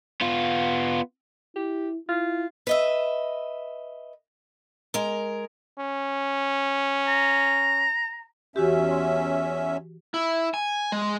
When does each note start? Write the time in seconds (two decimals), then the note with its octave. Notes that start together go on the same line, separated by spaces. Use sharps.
0.21 B3 F4
1.56 E4 G4
2.09 E4 F4
2.67 B4 D#5 E5
4.94 G#3 A#4
5.78 C#4
7.08 A#5
8.56 E2 E3 C#4 F#4 G4 E5
8.91 C6
10.14 E4
10.54 G#5
10.92 G#3